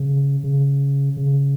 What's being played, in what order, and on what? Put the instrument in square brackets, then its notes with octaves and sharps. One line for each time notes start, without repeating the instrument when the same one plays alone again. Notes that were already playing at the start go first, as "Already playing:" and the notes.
Already playing: [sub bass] C#3
C#3
C#3